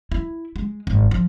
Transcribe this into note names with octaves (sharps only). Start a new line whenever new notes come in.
E4
G#3
G#1
F3